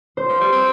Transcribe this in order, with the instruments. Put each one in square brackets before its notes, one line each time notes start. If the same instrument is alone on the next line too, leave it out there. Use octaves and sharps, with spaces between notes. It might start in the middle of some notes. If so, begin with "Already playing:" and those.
[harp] C5
[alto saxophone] F3
G3
C4